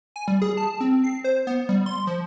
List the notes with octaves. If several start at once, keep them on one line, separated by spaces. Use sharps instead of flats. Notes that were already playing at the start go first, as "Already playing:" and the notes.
G#5
G3
G#4
A5
C4
C7
C5
B3
G3
C6
F3